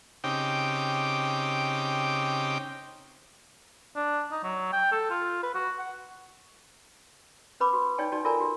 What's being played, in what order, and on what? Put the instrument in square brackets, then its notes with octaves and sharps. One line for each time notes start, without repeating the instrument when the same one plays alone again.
[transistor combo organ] C#3 C4 D#4 G4 G5 D6
[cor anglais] D4
D#4
F#3
G5
A4
F4
B4
F#4
F#5
[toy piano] C#4 B4 B5 D6
F#4
D#4 C#5 D5 G5 A5
D#4 F#4 D5 A5
F4 A4 A#4 D5 G#5 A#5
F#4